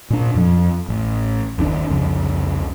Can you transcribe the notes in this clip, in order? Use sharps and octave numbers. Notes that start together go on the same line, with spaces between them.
A#2 D4
F2 F3
A1
F#1 D#2 C3 D4
C2 F2 C#3